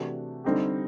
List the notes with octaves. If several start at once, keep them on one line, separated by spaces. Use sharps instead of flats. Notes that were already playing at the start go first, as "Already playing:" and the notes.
Already playing: C3 E3 A3 D4 F#4
D3 G3 C4 D#4 G4